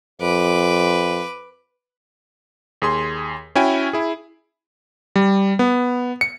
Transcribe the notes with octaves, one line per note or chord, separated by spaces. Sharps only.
F2 B4 D6
D#2 G#4 C6
C#4 E4 F#4 G5 G#5
E4 G#4
G3
B3
C#7